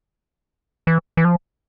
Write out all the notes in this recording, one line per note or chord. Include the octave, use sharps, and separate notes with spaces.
E3
E3
F3